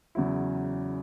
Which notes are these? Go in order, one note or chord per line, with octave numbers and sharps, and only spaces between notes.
E2 C#3 F#3 C#4 E4